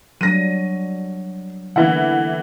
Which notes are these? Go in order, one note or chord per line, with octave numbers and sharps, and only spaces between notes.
F#3 G3 D4 A#6 D#7
D3 E3 A#3 B3 E4 F#5